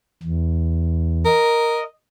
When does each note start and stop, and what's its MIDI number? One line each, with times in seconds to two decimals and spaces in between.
0.23 1.25 40
1.25 1.83 70
1.25 1.83 75